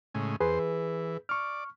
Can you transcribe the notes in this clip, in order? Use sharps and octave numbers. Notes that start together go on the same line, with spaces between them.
A2 C#3 G#3
E2 G#4 B4 C5
E3
D5 C#6 F6